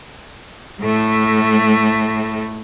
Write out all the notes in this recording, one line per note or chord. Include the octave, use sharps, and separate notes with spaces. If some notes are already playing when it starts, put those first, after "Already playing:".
A2 A3